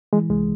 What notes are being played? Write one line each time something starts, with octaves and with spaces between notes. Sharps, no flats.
E3 G#3
C2 G#3